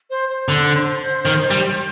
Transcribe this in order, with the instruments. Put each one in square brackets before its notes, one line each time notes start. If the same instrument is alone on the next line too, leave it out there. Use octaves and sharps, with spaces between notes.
[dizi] C5
C5
[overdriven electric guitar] D3
D#3
G3